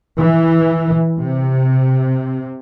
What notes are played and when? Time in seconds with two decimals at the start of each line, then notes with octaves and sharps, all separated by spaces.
0.18 E3
1.21 C3